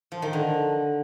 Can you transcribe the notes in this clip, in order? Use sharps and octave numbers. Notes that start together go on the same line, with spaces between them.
F3
D#3
D3